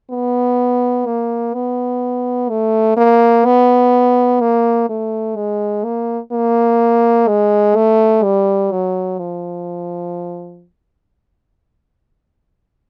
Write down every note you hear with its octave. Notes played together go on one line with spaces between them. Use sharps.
B3
A#3
B3
A3
A#3
B3
A#3
A3
G#3
A#3
A#3
G#3
A3
G3
F#3
F3